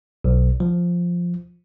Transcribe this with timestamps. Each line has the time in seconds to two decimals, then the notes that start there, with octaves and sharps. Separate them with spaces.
0.24 B1
0.60 F3